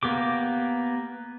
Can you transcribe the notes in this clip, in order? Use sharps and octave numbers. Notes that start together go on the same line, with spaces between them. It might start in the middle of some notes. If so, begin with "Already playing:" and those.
A#3 B3 G4 D6